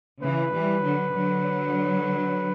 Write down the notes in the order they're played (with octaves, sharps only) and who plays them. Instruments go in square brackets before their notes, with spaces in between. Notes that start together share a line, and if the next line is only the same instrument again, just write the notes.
[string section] C#3 E3 [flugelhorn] B4
[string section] E3 G3
D3 F#3
D3 F#3